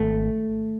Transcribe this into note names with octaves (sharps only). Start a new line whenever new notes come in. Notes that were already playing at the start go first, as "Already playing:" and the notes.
Already playing: G#1 A3